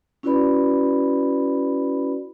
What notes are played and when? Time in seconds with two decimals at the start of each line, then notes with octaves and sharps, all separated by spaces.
0.23 C#4 E4 F#4 B4 D5 B5